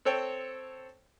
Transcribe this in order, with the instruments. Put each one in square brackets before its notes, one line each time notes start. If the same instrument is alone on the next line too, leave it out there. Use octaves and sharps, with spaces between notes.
[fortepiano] C4 A4 C#5 G5